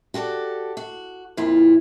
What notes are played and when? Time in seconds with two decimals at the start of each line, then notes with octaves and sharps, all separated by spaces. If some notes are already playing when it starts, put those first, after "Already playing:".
0.14 F#4 G4 A4 D5
0.77 F#4
1.37 F2 A#2 E4 F4